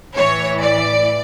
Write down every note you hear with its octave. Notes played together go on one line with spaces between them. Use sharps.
A2 E3 C#5
D5